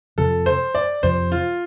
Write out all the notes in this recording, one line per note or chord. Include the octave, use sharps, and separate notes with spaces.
F2 C3 F3 A4
C5
D5
F2 C3 F3 C5
F4